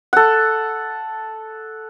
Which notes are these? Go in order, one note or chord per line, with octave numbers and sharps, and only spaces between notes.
A4 F#5